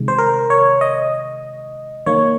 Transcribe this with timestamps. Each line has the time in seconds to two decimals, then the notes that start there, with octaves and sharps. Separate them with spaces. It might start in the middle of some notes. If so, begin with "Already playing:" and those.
Already playing: C3 D#3 G#3
0.08 C5
0.18 A#4
0.50 C#5
0.81 D#5
2.06 D#3 A#3 C#5